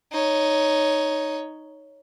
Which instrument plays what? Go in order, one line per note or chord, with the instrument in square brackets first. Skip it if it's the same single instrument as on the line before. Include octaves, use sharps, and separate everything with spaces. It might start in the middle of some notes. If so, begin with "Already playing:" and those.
[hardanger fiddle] D#4 C#5